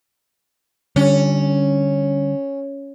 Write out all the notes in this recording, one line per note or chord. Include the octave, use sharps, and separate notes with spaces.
D3 G3 C#4